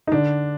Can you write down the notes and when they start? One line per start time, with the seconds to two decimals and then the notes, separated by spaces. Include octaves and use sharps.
0.07 D#4
0.12 D3 D4